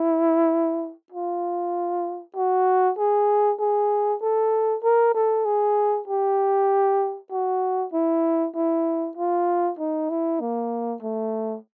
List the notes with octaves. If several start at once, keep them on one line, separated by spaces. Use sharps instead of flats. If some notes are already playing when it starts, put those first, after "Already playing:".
Already playing: E4
F4
F#4
G#4
G#4
A4
A#4
A4
G#4
G4
F#4
E4
E4
F4
D#4
E4
A#3
A3